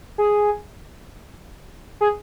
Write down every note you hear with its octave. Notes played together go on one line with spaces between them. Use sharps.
G#4
G#4